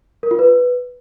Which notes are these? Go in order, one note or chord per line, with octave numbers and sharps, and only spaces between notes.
A#4
F4
B4